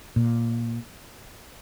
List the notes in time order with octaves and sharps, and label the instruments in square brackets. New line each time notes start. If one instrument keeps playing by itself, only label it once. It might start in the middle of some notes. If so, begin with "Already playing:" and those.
[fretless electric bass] A#2